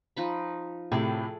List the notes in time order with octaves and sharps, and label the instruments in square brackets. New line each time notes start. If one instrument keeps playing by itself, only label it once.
[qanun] F3 D#4 B5
[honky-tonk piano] A2 C3 [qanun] G#4 A4 D5